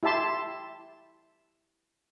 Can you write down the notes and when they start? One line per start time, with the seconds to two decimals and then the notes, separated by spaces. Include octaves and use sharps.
0.03 E4 G4 E5 A5 C6